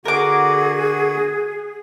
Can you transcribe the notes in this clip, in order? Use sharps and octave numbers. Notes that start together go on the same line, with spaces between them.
D3 F#4 G#4 A#4 F#5 D6